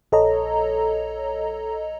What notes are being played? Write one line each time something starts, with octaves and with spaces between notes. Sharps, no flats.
A#1 A4 C#5 D#5 A#5